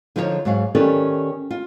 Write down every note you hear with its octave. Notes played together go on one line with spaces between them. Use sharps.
D3 F3 D#4 F4 B4 C#5
G#2 F#3 F#4 F5
D#3 C#4 G4 A4 B4 D5
F4